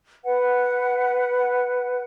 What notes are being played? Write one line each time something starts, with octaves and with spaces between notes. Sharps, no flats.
B4 F#5